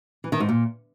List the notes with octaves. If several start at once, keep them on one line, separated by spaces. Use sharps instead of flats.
E3
D#3
G#2
A#2